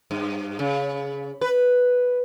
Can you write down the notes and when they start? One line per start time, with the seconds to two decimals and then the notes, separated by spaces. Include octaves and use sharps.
0.11 G2
0.59 C#3
1.41 B4